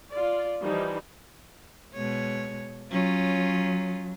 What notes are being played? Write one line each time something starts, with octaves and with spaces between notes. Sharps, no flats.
F4 D5
E3 F3 G3 D#4
B2 G#3 C#5
F#3 C#4 F4